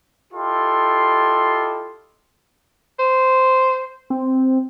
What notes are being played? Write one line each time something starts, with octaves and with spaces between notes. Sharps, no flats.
E4 F4 G4 A4 D#5 C6
C5
C4